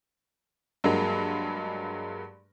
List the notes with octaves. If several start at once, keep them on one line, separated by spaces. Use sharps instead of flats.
G2 F#3 G#3 A#3